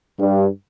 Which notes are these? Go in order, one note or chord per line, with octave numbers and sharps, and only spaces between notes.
G2